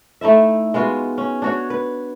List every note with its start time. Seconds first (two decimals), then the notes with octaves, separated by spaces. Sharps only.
0.21 A3 D#4 E4 E5
0.74 G#3 B3 F4 F#4
1.18 C#4
1.42 D4 F#4 C#5
1.70 B4